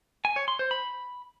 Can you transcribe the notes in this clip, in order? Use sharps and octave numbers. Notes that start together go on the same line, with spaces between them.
G#5
C#5
C6
C5
B5